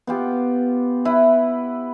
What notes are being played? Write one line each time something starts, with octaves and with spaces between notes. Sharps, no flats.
B3 F4 G4
E4 B4